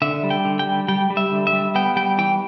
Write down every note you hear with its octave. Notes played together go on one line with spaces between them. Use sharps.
D3 E5
G3
G5
D3
G5
G3
G3 G5
G3
E5
D3
E5
G3
B3 G5
G3 G5
E3 G5